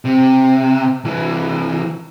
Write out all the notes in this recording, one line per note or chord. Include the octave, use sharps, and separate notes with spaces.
C3
C2 E3